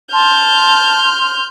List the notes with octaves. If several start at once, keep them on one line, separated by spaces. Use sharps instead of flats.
A5 C6 F6 G6